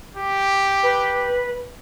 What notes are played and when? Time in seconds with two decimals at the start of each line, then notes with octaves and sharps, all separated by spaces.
0.17 G4
0.83 B4